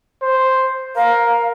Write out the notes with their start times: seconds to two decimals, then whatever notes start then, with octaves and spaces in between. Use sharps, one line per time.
0.22 C5
0.96 A#4 F5